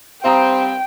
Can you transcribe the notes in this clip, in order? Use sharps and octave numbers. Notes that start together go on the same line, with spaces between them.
G3 C4 F5 G5 A#5 D#6